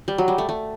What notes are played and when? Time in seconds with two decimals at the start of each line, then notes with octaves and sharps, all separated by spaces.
0.08 G3
0.18 F#3
0.28 G3
0.38 A3
0.49 A3